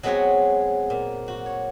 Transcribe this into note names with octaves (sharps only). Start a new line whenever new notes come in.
F#3 G#3 B3 C4 F#4 C#5
A#2
F#4
C#5